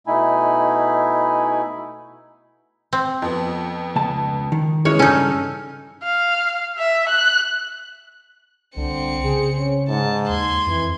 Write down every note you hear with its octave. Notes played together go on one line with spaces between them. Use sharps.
B2 A3 D#4 E4 G#5 B5
C4
F2 B3
C#2 A5
D#3
E3 G#3 C#4 C#5
G2 C#3 C#4 D#4 A4 E6 F6
F5
E5
F#6
C2 D3 C4 C#7
C#3 G#4
C#4
G#2 A5
D#2 C6 G#6
F2 E3